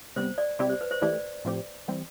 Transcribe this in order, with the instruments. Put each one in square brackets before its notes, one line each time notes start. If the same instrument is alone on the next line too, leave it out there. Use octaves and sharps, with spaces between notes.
[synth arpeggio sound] C3 G3 B3 [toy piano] C5
[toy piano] D5
[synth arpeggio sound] C3 G3 C4 E4 G4 [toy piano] D5
[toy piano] C5
B4
C5
[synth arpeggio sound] E3 A3 E4 G4 [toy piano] D5
[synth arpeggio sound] A2 F3 C4 G4
E3 G3 C4